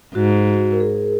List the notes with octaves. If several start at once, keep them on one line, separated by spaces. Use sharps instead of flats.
G#2 F#4
A#4
G#4